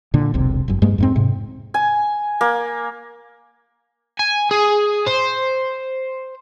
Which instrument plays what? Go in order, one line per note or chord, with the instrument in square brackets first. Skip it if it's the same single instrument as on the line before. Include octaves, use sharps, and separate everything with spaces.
[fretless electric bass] A#2 D3
E1 B1 C3
G1 F#2
G2 G#3 A#3
F2 G#2 C4
G#2 C3
[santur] G#5
A#3
[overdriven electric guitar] G#5
G#4
C5